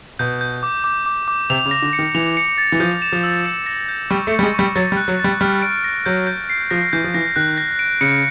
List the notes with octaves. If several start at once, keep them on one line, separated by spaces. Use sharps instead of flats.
B2 G6
G6
D6
D6
D6
D6
C3 F7
C#3
A#6
D3
C#7
D#3
E3 F7
C#7
A6
E3
F3 G6
E7
F3
E6
C#7
A#6
G6
G3 C#6
A3
C#7
G3
G#3
G3 C#6
F#3 A6
G3
F#6
F#3
G3 A6
G3 F6
D7
A#6
F#3 G6
G6
C7
F3 A#6
E3 G6
F3
E3 A#6
D#3 F#6
A#6
D7
C#3 C#7